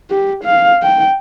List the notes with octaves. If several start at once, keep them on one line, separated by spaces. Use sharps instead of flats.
G4
F5
G5